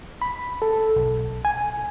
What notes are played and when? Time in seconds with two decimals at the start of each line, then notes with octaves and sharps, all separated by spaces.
0.21 B5
0.62 A4
0.96 B1
1.45 G#5